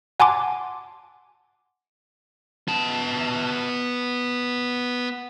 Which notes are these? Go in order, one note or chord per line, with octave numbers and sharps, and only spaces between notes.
F#5 G#5 A5 C6 D6
B3 A5